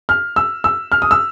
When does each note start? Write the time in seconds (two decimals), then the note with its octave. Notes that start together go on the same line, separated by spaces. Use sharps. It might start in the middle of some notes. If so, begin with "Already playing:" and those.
0.09 F6
0.36 E6
0.64 E6
0.92 F6
1.02 D#6
1.11 E6